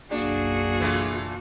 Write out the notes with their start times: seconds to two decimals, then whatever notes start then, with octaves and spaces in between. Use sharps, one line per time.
0.11 F#1 B1 A#3 D4 F#4 G#4
0.80 E3 A3 F4